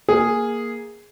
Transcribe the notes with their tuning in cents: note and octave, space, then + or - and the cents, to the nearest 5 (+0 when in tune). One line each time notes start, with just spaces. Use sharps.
A#3 +0 G#4 -5